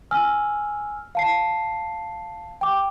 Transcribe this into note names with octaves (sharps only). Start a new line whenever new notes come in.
G#5 E6 F6
F5 A5 C7
G5 D6